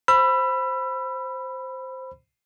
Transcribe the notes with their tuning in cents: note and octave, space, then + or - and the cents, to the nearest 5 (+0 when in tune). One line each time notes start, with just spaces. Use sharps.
C5 +0 B5 +0 E6 +35